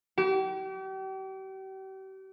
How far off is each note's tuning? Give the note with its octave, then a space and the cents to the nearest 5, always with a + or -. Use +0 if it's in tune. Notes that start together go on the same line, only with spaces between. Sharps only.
G4 -40